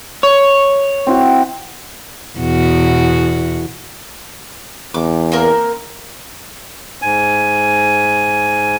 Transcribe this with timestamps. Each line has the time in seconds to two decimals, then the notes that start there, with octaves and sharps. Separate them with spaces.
0.23 C#5
1.07 C4 E4 F#4
2.39 E2 B2 F#4
4.94 E2 D6
5.32 A#3 C4 A#4
7.02 G#2 G#5